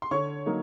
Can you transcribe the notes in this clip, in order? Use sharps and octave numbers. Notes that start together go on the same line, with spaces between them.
C6
D3 C#5 C#6
F#3 A#3 D#4